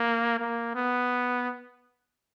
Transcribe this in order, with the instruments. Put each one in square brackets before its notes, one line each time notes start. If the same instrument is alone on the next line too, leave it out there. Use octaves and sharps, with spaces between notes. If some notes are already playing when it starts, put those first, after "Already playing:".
Already playing: [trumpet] A#3
A#3
B3